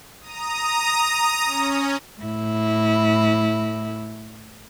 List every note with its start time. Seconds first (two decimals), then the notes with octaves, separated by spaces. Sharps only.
0.21 A#5 D#6
1.45 C#4
2.21 A2 E4